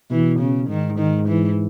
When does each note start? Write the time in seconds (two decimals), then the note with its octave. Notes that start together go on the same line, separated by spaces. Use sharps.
0.11 B2 E3
0.40 C#3
0.69 G#2 D#3
0.99 D#3
1.28 E3